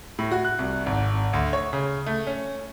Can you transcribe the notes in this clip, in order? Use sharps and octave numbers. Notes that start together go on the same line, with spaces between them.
A2
F#4
F#6
C2
G#1
D2
C#5
C#3
A3
C#4